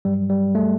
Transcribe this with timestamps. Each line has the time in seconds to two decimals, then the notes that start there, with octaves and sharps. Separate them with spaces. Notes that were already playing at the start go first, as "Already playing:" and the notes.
0.05 G2 F#3 G3
0.29 G3
0.55 A3